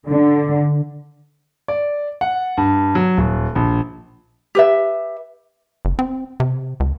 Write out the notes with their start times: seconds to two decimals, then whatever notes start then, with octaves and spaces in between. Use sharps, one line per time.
0.10 D3
1.68 D5
2.21 F#5
2.57 G2
2.95 F#3
3.17 D#1
3.55 A#1
4.55 G4 B4 E5
5.85 F#1
5.99 C4
6.40 C3
6.80 C#2